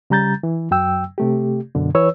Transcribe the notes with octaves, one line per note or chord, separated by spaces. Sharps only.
C#3 G3 A#5 G6 A6
E3
F#2 F#3 G5 E6
C3 A3 G4
F#2 B2 D3
E3 B4 C#5 E6